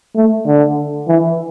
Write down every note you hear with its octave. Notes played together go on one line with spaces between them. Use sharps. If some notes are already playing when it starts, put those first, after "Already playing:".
A3
D3
E3